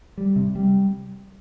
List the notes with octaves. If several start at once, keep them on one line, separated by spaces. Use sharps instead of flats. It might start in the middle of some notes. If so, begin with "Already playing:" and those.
G3
C3
G3